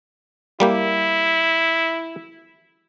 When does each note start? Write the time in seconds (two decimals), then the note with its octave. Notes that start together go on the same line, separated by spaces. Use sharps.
0.60 G3 A#3 E4 G4